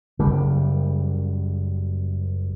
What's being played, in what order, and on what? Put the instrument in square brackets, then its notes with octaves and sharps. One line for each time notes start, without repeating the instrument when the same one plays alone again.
[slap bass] F#1 G3